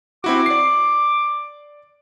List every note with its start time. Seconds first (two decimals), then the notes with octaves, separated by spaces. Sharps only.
0.24 C4 E4 F#4 D6
0.46 D5 C7